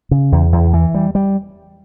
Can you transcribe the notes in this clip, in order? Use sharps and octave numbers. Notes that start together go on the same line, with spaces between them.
C#3
E2
E2
E3
G3
G3